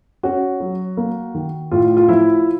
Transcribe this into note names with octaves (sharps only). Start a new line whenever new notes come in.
C#4 F#4
F#3
A#3
D#3
A2 F4
F4
F3 E4